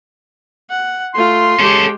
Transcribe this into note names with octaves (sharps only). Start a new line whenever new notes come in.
F#5
A3 F4 C6
G#3 C#4 G4 A4